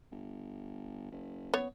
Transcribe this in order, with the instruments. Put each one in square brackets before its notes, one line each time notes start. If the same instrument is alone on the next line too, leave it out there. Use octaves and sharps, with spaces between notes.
[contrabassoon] G1
F#1
[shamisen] B3 C#5